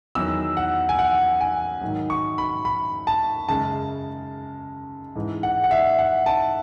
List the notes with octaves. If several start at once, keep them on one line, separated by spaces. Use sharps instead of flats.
E2 D#3 F#3 E6
F#5
G#5
F#5
G#5
G#2 D#3 F#3
C#6
B5
B5
A5
F#2 C#3 G#3 A5
G#2 E3 G#3
F#5
F#5
E5
F#5
A5